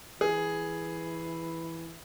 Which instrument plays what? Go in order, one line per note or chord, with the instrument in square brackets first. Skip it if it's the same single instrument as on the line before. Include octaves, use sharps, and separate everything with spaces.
[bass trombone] E3 [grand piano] G#4